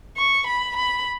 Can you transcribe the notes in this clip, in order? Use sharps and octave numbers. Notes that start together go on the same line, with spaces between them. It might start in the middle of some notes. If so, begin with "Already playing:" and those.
C#6
B5
B5